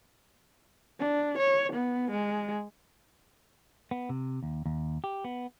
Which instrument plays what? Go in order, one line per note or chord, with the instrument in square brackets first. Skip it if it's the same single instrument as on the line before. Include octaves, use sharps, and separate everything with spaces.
[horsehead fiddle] D4
C#5
B3
G#3
[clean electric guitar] B3
C3
D#2
D#2
G4
B3